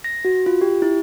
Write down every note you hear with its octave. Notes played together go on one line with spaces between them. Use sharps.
A#6
F#4
F4
G4
E4